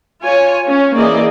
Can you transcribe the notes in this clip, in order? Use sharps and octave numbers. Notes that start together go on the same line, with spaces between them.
F4 C#5 G#5
C#4
E3 A#3 G#4 D5 D#5